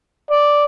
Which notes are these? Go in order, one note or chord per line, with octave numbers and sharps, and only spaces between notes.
D5